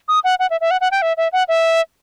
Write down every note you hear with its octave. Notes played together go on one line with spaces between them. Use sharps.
D#6
F#5
F#5
E5
E5
F#5
F#5
G5
E5
E5
F#5
E5